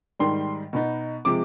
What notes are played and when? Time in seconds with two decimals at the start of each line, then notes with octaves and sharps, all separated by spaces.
0.19 G#2 D#3 G3 C6
0.73 B2 B3 D#4
1.25 C3 F3 G#3 D6